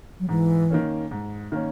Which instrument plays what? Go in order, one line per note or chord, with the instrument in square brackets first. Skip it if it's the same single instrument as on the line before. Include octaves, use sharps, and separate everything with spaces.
[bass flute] F#3
[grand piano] G#2 [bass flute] E3
[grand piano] D#3 A#3 C#4
G#2
D#3 A#3 C#4